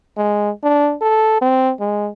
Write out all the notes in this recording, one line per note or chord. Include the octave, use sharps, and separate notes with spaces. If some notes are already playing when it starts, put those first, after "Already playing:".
G#3
D4
A4
C4
G#3